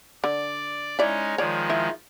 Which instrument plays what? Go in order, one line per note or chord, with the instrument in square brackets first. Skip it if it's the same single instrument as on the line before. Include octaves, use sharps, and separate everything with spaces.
[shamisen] D3 [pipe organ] D5
[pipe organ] G#3 C#4 D#4 [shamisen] E4 D5
[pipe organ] D#3 F3 G#3 [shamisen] C#5 D5
[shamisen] E4 E5